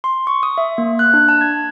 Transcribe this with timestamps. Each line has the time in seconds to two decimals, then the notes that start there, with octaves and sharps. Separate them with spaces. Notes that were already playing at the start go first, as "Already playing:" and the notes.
0.04 C6
0.27 C#6
0.43 D#6
0.58 E5
0.78 A#3
0.99 F#6
1.14 D4
1.29 A5
1.41 G#6